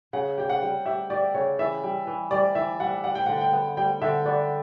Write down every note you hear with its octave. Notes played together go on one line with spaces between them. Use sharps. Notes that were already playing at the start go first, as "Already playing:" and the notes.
C#3 F#5
G4 G5
F#5
G3
G4 E5
G4 D5
C#3 C#5
E3 E5
G3
E3
G3 D5
E3 E5
G3 F#5
G3 F#5
G5
D3 F#5
G5
B3
G3 G5
D3 E5
B3 D5